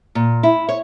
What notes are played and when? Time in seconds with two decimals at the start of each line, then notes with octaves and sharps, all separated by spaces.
0.15 A#2
0.43 E4
0.69 C#5